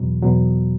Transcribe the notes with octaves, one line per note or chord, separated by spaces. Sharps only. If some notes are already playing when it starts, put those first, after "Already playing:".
Already playing: E2 B2 F#3
E2 B2 F#3